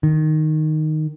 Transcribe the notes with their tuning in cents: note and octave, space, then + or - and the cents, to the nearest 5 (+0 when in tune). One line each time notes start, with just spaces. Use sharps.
D#3 -5